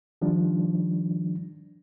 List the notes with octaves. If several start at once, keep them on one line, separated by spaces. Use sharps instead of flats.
D#3 F3 G3 D4